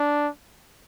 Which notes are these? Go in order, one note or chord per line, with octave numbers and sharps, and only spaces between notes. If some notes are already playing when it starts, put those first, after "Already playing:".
Already playing: D4